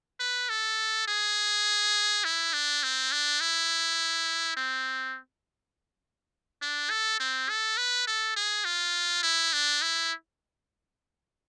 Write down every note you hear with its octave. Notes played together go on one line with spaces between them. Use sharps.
B4
A4
G#4
E4
D4
C4
D4
E4
C4
D4
A4
C4
A4
B4
A4
G#4
F4
E4
D4
E4